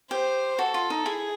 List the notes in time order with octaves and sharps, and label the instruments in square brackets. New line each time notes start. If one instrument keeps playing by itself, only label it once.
[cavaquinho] G4 [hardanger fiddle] C5
[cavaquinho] F#4 [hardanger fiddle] A4
[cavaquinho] F4
D#4
[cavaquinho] E4 [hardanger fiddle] G#4